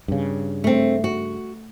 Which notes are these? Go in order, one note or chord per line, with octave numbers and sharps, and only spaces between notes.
G2 C#3
A3 C4
F#4